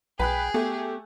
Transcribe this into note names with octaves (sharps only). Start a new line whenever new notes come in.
B1 G#4 B4 G5 B5 F#6
A3 B3 G4